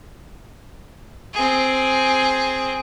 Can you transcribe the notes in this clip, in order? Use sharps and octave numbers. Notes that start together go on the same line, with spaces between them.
C4 G#4